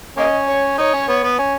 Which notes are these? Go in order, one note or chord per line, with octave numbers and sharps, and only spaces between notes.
A#3 C#4 D#5
C#5
D#4 C#5
C#4
B3
B3
C#4